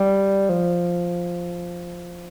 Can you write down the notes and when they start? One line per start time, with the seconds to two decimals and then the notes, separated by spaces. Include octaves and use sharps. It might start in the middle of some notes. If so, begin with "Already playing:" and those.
Already playing: G3
0.49 F3